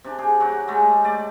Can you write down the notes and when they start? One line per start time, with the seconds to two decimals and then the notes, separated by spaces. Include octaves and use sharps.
0.04 C3 D4
0.18 G4 G#4
0.40 F#3 F#4 G4
0.68 G#3 A3 G4
1.04 A3 D5 D#5